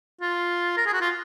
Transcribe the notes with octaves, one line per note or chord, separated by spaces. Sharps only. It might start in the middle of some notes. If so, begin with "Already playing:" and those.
F4
A#4
G#4
F#4
F4